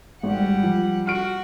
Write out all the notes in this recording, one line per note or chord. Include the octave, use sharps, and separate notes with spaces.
G#1 G3 F#5
F3
F#4 F6 D7